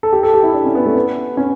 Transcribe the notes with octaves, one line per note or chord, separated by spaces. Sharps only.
A4
G4
A4
G4
E4
D4
C#4
B3
A3
B3
C#4